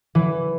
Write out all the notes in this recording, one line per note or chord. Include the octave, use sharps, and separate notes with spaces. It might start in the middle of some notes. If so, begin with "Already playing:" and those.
E3